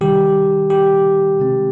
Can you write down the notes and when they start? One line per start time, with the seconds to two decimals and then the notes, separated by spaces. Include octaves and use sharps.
0.01 C3 D#3 G3 G4
0.70 G4
1.39 C3 D#3 G#3 C4